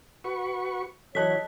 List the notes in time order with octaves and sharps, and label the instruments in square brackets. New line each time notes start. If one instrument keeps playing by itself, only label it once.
[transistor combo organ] F#4 B4 C#6
[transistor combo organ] E3 F#3 [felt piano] A4 D#5 F#6 [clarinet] C#5 [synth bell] A5 B6